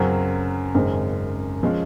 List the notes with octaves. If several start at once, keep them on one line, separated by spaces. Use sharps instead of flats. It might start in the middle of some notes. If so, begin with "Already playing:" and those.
Already playing: F#2 C#3 F#3 C4 F#4
G#1 F#2 C#3 G#3 C4
F3 G#3 C#4